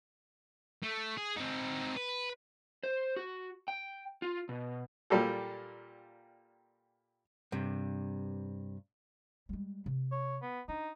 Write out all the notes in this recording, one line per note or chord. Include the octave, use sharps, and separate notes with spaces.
A3
G#4
C4 D#4
B4
C5
F#4
G5
F4
B2
A#2 G3 A#3 G4 A4
G2 C3
G3 G#3
C3
C#5
B3
D4 D#4